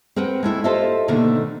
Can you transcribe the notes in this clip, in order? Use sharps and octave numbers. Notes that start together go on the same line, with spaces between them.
C4 A#4 B4 F#5 G5
G#3 A3 E4
F4 G4 A4 C5 D#5 E5
B2 D3 D#3 A3 A#3